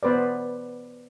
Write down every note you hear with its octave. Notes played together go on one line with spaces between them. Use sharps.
B3 B4 C5 D5